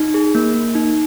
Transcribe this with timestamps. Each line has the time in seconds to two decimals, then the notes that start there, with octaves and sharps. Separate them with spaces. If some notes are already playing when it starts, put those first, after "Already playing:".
Already playing: D#4
0.14 G#4
0.35 A#3
0.54 A#3
0.75 D#4